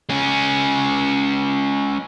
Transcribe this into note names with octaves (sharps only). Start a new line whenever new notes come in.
G#3 C#4